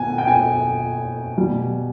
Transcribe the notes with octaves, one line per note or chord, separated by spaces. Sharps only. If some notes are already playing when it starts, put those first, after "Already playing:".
Already playing: B2 G#5
G5
G#5
B2 G3